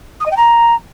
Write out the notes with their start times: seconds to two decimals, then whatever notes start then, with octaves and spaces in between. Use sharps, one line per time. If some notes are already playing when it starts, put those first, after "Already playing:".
0.20 D#6
0.26 D#5
0.31 G5
0.37 A#5